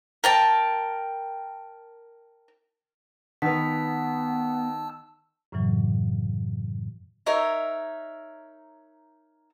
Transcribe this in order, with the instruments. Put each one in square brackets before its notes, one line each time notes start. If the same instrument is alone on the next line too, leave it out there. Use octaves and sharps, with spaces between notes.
[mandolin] A#4 G5 A5
[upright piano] D#3 [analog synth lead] B3 [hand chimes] B4 B6 [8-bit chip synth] A5 E6
[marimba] F#2 A2 C#3 E3 F#3
[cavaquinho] D#4 A#4 C#5 E5